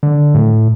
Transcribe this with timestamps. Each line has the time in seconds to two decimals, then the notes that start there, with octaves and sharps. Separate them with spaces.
0.03 D3
0.34 A2